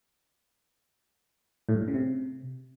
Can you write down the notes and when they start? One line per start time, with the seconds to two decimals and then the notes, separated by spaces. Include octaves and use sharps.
1.69 A2
1.75 G2
1.81 A2
1.88 C#3
1.94 C3